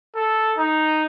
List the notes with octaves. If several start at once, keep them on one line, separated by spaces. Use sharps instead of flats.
A4
D#4